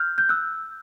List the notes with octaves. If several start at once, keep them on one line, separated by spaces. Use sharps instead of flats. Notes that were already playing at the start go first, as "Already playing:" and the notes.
Already playing: F6 G6
G6
E6 F#6